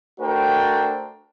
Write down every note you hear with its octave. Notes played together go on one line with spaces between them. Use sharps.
A3 D4 F#4 A#4 C5 G5